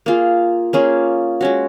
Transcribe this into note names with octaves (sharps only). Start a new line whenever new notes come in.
A#3 F4 G#4
A#3 C#4 F4 G#4
G#3 C#4 F#4